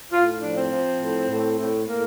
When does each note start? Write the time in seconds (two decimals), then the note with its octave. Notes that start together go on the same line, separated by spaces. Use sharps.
0.12 A2 F4
0.41 F3 D4
0.56 C4
0.71 F3
1.00 A2
1.29 A2
1.59 A2
1.87 A2 A#3